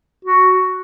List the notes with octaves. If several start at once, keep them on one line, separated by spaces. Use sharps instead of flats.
F#4